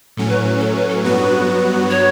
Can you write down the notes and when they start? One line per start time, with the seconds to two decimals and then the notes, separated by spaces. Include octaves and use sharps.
0.17 A2 F#3 C#4 A4
0.29 B4
0.60 A4
0.75 B4
0.89 A4
1.04 G2 F#3 B3 F#4 B4
1.91 C#5